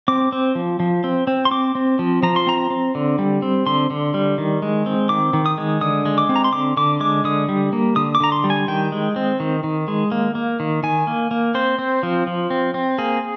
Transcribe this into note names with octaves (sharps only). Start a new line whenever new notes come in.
C4 D6
C4
F3
F3
C4
C4
C6
C4 D6
C4
F3
F3 A#5
C6
C4 A#5
C4
D3
G3
C4
D3 C6
D3
G3
D#3
G#3
C4
D#3 D6
D#3
D#6
G#3
D3 D#6
G#3
D6
C4
A#5
C6
D3 D6
D3 D6
G#3 D6
D3 D#6
G3
A#3
D3 D#6
D6
D3 A#5
C6
G3
G#5
D#3 G5
G#3
C4
D#3
D#3
G#3
A#3
A#3
D#3
D#3 G#5
A#3
A#3
C4 C5
C4
F3
F3
C4
C4
A#3 G#4